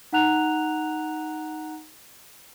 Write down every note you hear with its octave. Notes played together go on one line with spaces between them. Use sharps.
D#4 F#5 A#5 F#6 F7